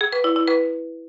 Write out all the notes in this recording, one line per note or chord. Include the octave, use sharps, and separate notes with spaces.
G#4
B4
E4
E4
B4